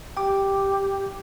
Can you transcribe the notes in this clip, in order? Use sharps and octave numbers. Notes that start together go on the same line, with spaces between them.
G4 G5 D6